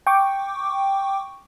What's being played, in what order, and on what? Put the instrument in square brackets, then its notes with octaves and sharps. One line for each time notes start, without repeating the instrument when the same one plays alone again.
[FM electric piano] G5 C#6 D6